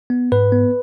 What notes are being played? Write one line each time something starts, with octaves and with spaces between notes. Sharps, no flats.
B3
G#2 B4
B3